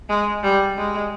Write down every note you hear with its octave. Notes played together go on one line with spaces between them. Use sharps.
G#3
G3
G#3